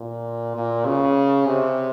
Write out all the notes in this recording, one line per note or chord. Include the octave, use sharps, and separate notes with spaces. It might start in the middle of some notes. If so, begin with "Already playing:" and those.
Already playing: A#2
A#2
C#3
C3